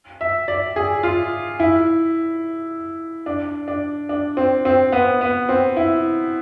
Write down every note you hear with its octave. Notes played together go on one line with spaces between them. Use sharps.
E5
D5
G#4
F4
E4
D4
D4
D4
C4
C4
B3
B3
C4
E4